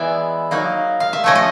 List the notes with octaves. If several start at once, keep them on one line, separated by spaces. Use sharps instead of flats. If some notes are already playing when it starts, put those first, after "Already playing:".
Already playing: E3 G#3 B3 E4 D5 E5
F#3 A#3 D#4
F5
E5
F3 A3 C#4 C#5 D#5
D#5